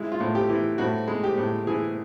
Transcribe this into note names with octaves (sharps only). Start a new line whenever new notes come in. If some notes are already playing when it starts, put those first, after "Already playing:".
Already playing: G#3 E4
F4
A2
G4
E3
A2 F#4
G#3
G4
A2
E3 G#4